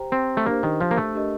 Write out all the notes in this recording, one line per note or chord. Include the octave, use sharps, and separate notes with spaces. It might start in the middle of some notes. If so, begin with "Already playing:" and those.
Already playing: G4 C5 G5 A#5
C4
A3
A#3 D4 G4 C5
D#3
F3
A#3
A3
D4 G4 A#4 D#5